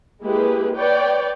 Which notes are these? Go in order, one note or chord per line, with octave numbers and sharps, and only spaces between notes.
G#3 A#3 E4 G4 G#4 B4
B4 C#5 D5 G5